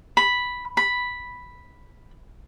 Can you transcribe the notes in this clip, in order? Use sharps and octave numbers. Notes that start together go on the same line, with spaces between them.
B5
B5